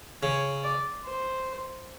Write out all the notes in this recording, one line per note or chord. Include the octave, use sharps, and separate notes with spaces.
C#3 C#5
D5
C5